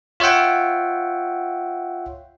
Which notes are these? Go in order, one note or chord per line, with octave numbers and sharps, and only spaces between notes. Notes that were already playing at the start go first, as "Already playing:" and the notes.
F4 C#5 E5 F#5 G5